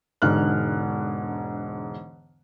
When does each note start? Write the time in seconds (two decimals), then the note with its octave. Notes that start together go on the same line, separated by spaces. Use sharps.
0.22 E1 G#2 D3 F6 F#6